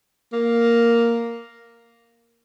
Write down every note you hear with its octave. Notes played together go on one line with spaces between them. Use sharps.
A#3